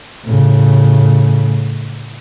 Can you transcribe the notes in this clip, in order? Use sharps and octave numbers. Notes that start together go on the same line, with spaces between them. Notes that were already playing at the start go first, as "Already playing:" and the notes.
A2 C#3